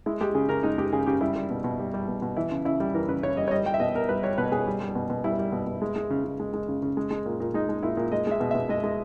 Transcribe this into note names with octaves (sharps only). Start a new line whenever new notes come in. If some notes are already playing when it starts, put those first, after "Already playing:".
G#3 E4
G#3 G4
C#3 G#4
C#3 A#4
G#3 D#4
G#3 G4
C#3 G#4
C#3 G4
G3 E4
G3
B2
B2
G3
G3
B2
B2
E3 E4
C#3
C#3 E4
G3
E3 A#4
C#3 B4
C#3 C#5
G3 D#5
C#5
G3 D#5
G3 G5
E5
B2 D#5
B2 A#4
G3 B4
G3 C#5
B2 B4
B2 G#4
G3
G3
B2
B2
G3 E4
G3
B2
B2
G#3
G#3
C#3
C#3
G#3
G#3
C#3
C#3
G#3
G#3
A#2
A#2
G#3 D#4
G#3
A#2 E4
A#2
G#3 D#5
G#3 E5
B2
E5
B2
G#3 D#5
G#3